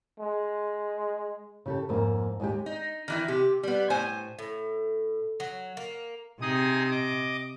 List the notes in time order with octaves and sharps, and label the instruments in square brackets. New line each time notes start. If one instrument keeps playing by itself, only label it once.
[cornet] G#3
[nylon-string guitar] C#3 G4 A4
F2 G#2 A#3 C5 G#5
D#2 G#3 G4
[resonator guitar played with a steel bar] D#4
D#3 E3 E4
C3 G4
G3 B3
A2 C5 G#5
[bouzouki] A2
F#3
A#3
[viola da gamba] C3 [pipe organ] D#4 G#4 D#6
[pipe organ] D#5 D6